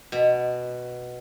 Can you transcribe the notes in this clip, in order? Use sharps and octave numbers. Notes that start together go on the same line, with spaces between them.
B2